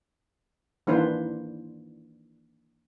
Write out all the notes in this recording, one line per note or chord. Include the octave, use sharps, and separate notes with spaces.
D#3 E3 A#3 D4 B4 C5